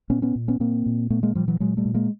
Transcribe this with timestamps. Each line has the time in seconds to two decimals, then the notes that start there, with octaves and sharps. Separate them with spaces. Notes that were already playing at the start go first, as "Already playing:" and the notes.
0.10 A#2 B3 C#4
0.22 B3 C#4
0.36 A#2
0.48 B3 C#4
0.60 A#2 A#3 C4
0.86 A#2
1.10 A#2 A3 B3
1.23 G#3 A#3
1.35 A#2 F3 G3
1.48 E3 F#3
1.60 A#2 F#3 G#3
1.77 G3 A3
1.85 A#2
1.94 G#3 A#3